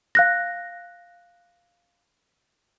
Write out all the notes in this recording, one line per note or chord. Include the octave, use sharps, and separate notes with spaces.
F5 F#6 A#6